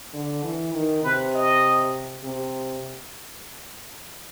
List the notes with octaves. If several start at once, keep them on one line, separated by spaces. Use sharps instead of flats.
D3
E3
D#3
C3 B4
D#5
C3